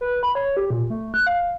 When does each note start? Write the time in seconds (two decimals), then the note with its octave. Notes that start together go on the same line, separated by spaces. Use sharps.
0.01 B4
0.23 B5
0.35 C#5
0.57 G4
0.70 A#2
0.90 A3
1.14 F#6
1.27 F5